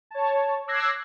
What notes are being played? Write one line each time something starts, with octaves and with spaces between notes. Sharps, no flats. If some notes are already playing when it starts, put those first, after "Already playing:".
C#5 A5
D6 E6 F#6 G#6 A#6 C7